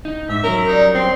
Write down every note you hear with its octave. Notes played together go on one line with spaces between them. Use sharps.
D#4
G#2 E5
F#3 C#4 A#4
G2 G3 D#4
C4 C6